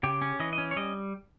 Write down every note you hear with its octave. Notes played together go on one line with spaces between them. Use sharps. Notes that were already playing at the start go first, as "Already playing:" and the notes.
C#3 G4
C#4
E3 D#5
D#5
C#4
C#5
G3 D#5